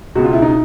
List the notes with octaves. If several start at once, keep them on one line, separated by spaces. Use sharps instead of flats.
C#2 B2 F#4
F4
E4
D#4